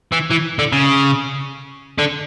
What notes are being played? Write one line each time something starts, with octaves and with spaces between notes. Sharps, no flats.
E3
E3
D3
C#3
D3